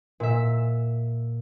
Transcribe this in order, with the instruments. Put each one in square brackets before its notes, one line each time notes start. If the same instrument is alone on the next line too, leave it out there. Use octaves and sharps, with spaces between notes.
[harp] A#2 E5